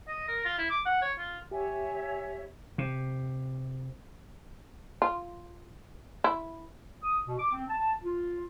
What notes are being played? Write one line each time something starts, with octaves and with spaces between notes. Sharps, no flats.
D#5
A#4
F4
E4
D6
F#5
C#5
F4
G4 C#5 E5 G#5
C3
F4
E4
D#6
B2
D6
C4
A5
F4